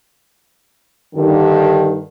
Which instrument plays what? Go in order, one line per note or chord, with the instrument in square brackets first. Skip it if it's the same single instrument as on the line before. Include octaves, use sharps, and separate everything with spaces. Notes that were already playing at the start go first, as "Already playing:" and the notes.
[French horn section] G2 D3 D#3